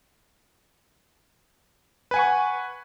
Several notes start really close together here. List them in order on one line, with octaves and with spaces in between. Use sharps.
B4 G#5 F#5 C#6